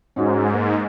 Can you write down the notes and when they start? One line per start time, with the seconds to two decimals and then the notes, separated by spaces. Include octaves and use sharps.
0.16 G#2 C#4 D#4 F#4
0.54 A#3